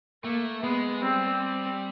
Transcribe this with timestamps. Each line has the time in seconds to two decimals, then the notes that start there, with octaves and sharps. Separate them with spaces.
0.24 A3 A#3
0.62 G#3 B3
1.02 G3 C4
1.41 C4